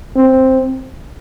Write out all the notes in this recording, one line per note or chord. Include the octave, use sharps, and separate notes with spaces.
C4